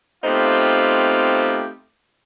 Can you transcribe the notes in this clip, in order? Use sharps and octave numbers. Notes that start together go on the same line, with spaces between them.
A3 B3 C4 D#4 F4 G4